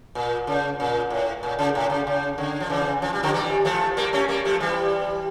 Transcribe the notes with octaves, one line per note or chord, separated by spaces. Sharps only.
A#2
C#3
A#2
A2
A#2
C#3
A2
C#3
C#3
D3
F3
C#3 E3
F3
G3
D3 F3
E3 G3
F3 A3
G3 A#3
A3 C#4
G3 A#3
F3 A3
E3 G3